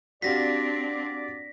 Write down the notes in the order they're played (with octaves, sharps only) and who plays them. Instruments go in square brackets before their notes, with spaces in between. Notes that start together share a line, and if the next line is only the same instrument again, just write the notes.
[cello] C4 D4 [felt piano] F#4 G4 F5 [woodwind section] D5 [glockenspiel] A#6 B6